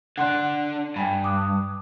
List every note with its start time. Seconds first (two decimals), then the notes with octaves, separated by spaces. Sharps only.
0.18 D3 D4 F#5 C6 F#6
0.96 G2 G5 G#5 B5
1.24 D6 D#6 F#6